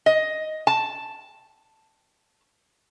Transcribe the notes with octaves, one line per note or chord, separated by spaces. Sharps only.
D#5
A5